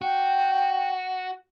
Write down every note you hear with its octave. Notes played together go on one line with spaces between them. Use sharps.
F#4 G5